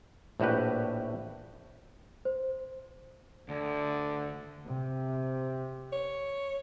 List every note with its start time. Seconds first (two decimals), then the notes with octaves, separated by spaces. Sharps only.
0.40 A#1 A2 F#4 G4 B4
2.25 C5
3.49 D2 D3
4.66 C3
5.92 C#5